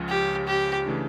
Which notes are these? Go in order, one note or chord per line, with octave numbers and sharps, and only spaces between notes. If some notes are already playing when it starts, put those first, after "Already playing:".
Already playing: C#2 C#3 F3 C#4
G4
G4
C#3 E3 A3 D4